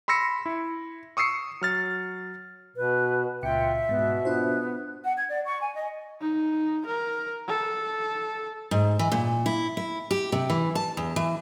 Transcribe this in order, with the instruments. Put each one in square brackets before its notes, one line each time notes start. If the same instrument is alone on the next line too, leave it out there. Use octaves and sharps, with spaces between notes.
[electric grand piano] B5 C6 E6 A#6 C#7
E4
C#6 D#6 E6 C7 C#7
F#3 F6 A6
[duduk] B2 [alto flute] B4
[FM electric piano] C#2 A#2 C#7 [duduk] F4 [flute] E5 [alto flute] G5
[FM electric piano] G#2 [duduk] B2 [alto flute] B3
[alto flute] B3 [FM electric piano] D4 F4 C5
[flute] F#5
G#6
D5
C#6
G#5
D#5
[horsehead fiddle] D#4
A#4
A4
[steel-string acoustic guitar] G#2
E3
A#2
E4
E4
G4
C3
E3
A5
E2
E3